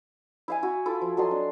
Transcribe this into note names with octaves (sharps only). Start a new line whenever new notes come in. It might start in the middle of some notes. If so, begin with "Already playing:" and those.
E4 F5 G#5
E4 F#4
E4 F4 A4
F3
F#3 A4 D#5 C6
D4